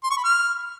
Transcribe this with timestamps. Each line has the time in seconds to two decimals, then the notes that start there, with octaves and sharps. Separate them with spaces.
0.03 C6
0.10 C#6
0.17 B5
0.24 F6